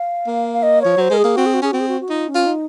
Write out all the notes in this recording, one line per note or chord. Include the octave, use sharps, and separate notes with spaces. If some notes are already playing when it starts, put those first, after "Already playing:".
Already playing: F5
A#3
F5
D#5
F3 C#5
F#3 C5
G#3 A#4
G#4
A#3
C4 F#4
G#4
F#4
C#4 G#4
C4 F#4
G#4
F#4
F#4
D#4 F4
C#4
F4
D#4